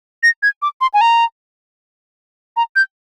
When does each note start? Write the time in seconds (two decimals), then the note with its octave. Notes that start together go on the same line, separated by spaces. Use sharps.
0.23 A#6
0.43 G#6
0.62 D6
0.81 C6
0.94 G#5
1.01 A#5
2.57 A#5
2.76 G6